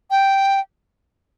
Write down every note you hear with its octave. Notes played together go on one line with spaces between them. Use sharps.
G5